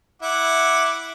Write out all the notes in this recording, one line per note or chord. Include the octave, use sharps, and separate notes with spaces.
E4 F#5 D6